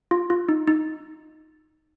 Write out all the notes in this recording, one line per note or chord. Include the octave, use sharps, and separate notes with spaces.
F4
F4
D#4
D#4